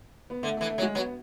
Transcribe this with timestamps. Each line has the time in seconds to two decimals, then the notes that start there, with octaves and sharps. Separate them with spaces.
0.30 B3
0.43 D3 A3
0.57 A3
0.61 E3
0.69 A3
0.78 F#3
0.82 G#3
0.95 F#3 B3